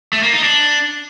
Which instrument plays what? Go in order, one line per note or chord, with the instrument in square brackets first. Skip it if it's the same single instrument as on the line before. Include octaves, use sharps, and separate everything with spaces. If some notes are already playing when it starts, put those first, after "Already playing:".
[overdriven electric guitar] A3
A#3
D#4
D4